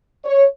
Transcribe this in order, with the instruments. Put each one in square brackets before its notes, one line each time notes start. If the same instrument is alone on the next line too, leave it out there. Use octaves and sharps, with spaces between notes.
[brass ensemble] C#5